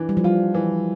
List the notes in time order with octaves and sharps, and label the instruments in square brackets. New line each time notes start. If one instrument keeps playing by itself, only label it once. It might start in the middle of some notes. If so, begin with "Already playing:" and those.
Already playing: [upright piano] E3 D4
[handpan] G3
F3
[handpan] G3 [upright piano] F4
[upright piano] E3